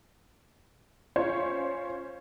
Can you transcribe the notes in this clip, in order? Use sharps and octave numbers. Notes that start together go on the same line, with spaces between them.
C#4 F4 C5 C#5